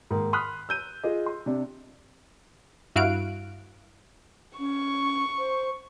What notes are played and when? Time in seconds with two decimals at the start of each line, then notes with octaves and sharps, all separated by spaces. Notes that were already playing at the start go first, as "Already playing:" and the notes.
0.11 G#2 D#3 A#3
0.33 B5 C6 D#6 F6 F#6 B6
0.69 E6 G6 D#7
1.04 F4 G#4 D#5
1.26 C6
1.46 C3 D4
2.96 G2 E4 F#4 F5 F#6 D7
4.59 C#4 C#6
5.38 C5